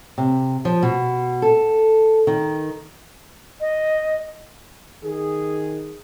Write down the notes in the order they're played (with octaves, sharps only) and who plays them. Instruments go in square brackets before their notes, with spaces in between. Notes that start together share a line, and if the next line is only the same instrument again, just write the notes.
[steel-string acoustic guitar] C3
F3
B2
A4
D#3
[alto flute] D#5
[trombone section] D#3 G#4